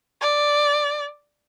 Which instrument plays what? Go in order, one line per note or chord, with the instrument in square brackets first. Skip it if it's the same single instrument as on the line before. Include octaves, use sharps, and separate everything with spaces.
[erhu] D5